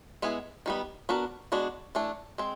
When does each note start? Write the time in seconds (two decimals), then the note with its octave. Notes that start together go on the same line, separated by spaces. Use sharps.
0.22 G#3 B3 E4 G#4
0.66 D#3 G3 B3
1.09 B3 D4 F#4 A#4
1.52 G#3 B3 D4 F#4
1.95 E3 A3 D4
2.38 G#3 C4